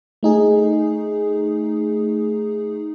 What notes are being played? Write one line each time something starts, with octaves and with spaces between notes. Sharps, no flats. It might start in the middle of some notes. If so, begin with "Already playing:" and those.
A3 D#4 G#4